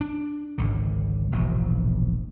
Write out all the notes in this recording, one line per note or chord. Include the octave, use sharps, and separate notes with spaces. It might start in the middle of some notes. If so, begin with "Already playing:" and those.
D4
G#1 C#2 D3
E1 A#1 G#2 B2